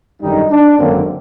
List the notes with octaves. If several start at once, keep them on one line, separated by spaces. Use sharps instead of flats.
G#1 F#2 D3 G3 D#4
D4
G#1 F#2 D3 F#3 A#3 C4